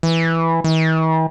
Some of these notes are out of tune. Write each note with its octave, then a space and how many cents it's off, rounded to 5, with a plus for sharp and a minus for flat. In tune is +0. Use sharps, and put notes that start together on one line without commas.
E3 +0
E3 -45